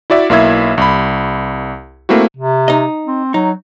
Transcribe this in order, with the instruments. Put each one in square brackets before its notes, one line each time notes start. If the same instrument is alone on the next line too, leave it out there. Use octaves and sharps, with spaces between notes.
[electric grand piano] E4 F#4 D5 E5
B1 A#3 E4 E5 G#6
C2 B5
A3 A#3 C4 E4 F#4
[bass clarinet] C3
[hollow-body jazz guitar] D#4 D#5
[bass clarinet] C4
[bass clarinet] F#3 [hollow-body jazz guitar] D#4